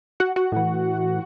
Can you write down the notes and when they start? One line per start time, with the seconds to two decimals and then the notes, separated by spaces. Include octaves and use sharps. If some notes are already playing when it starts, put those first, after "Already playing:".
0.20 F#4 F#5
0.36 F#4 F#5
0.52 A2 E3